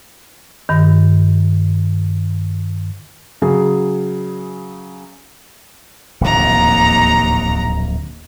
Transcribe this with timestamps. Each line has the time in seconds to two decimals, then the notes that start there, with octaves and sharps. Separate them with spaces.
0.69 G2 D#3
3.42 C#3 F#3 G#4
6.21 D1 A#1 D#2 C3 A#5